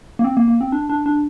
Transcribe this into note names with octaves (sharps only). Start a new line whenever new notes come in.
A#3
C4
A#3
A#3
C4
D4
D4
D4